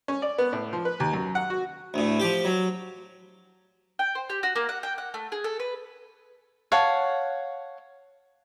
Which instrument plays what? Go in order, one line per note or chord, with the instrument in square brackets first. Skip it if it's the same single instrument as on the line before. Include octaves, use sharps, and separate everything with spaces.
[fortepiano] C#4
D5
B3
A2
F3
B4
D#2
F#2
F#5
F#4
[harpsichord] D2 A2
F3 G4
F#3
[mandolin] G5
C5
G4
F#4
A#3
F#5
G5
F#5
A3
G#4
A4
B4
[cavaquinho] C#5 F5 F#5 A5